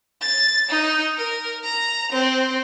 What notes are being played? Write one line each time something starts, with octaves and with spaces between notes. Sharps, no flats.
A6
D#4
A#4
A#5
C4